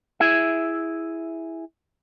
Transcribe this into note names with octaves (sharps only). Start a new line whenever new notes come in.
E4 G#4 E5